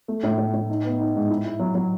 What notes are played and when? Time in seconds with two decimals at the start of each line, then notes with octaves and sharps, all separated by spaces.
0.08 A3
0.23 A2
0.38 A2
0.54 A2
0.70 D#4
0.84 B3
0.99 D#4
1.15 G#2
1.30 E4
1.44 E4
1.59 F#3
1.75 F#3